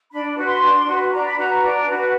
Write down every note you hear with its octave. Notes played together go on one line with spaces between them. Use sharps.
D4 B5
F#4 B4
C6
D4
F#4 B4
D4 A#5
B5
F#4 B4 A#5
D4
F#4 B4